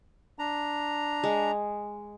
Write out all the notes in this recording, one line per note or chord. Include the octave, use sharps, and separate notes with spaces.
D4 A#5
G#3